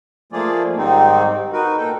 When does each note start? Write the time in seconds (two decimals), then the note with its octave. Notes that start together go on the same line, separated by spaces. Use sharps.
0.32 F3 A3 A#3 F4 G#4 D5
0.77 G#2 D#3 G3 C4 D#4
1.53 D#4 F#4 A#4 B4
1.78 A#2 A4 G5